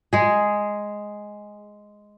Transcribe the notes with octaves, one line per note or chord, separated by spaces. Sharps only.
G#3 G#4